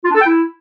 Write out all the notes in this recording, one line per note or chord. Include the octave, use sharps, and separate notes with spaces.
F4
D4
A4
G5
E4